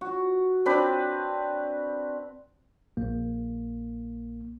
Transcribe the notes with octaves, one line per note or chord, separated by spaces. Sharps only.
F#4
C4 D4 B4
A#1 A#3